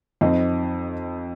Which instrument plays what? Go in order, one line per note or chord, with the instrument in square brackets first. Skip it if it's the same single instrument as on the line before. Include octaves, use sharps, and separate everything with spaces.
[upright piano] F2 C4 D#4